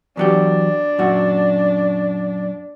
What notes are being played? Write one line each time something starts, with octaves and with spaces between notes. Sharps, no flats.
E2 F#3 D4 G4
F#2 A#2 F#4